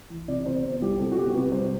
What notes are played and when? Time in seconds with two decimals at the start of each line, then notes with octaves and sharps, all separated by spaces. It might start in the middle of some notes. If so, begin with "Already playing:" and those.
0.10 E3
0.28 C3 D5
0.46 C3 C5
0.63 B3 C5
0.82 G3 G4
0.99 C3 A4
1.11 F#4
1.17 B3 G4
1.35 C3 B4
1.52 G3 C5